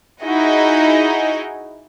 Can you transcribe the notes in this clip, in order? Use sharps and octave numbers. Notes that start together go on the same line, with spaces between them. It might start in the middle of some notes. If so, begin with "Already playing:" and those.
D#4 E4 F#4 G#4 D#5